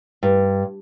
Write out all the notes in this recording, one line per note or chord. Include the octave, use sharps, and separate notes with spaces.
G2